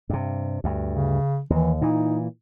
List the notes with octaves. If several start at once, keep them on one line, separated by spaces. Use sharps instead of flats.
G2 C3
D2 G2
C#3
D#2 E3
A#2 E3 D#4